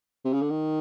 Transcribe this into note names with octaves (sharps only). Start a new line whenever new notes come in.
C3
C#3
D3
D#3